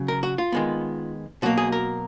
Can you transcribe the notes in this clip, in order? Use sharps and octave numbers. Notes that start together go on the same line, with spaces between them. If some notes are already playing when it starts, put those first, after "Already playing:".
Already playing: C#3 F#3
A#4
F#4
F4
D#3 G#3 B3
B2 F#3 A#3 F#4
G#4
A#4